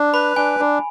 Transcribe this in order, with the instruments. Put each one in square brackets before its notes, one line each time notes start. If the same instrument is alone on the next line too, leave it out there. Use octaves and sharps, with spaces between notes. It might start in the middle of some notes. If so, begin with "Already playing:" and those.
Already playing: [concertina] D4
[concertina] B4 [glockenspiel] B5
[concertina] D4 [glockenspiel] G#5
[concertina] D4